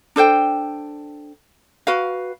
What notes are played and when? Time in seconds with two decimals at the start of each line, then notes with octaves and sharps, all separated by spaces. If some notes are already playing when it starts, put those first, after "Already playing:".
0.16 D4 A4 C5 G5
1.87 F#4 B4 F5